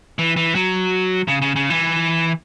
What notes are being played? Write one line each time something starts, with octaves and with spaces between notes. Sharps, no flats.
E3
E3
F#3
C#3
C#3
C#3
E3